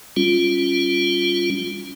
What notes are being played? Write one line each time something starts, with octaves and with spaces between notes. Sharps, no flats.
G3 C#4 F4